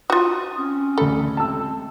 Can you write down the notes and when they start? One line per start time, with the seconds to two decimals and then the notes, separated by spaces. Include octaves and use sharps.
0.10 F4 F#4 D#6
0.58 C4 C#4
0.98 D2 A3 A4 B5
1.37 G#3 A3 C4 A5 E6